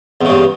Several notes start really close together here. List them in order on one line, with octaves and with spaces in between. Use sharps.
E2 C#3 G2